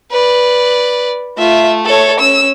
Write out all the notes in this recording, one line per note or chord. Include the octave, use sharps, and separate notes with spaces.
B4 D5
A3 F4 E5
A4 C#5
C#4 E6